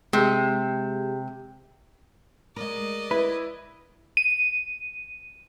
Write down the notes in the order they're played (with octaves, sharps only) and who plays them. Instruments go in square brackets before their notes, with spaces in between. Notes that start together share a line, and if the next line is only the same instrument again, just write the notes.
[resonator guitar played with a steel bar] C3 [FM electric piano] G#3 G4
[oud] G#3 A#4 [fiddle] D5 D#5
[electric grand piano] E4 [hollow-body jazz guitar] B4
[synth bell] D#7